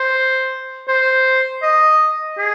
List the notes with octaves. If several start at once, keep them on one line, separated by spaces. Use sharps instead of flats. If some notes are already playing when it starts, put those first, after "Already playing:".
Already playing: C5
C5
D#5
G#4